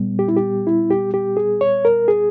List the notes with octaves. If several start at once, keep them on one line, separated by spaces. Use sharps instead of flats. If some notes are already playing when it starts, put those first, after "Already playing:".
Already playing: A#2 G3 B3
G4
E4
G4
E4
G4
G4
G#4
C#5
A#4
G#4